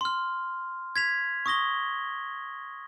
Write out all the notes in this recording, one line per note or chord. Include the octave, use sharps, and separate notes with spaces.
C6 F6
G#6 B6 F7
C#6 D#6 A#6 G7